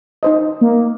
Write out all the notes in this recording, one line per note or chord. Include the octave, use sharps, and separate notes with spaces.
D#4 C5 D#5
A#3